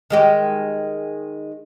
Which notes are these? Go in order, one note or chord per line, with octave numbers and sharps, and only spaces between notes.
D#3 G#3 G4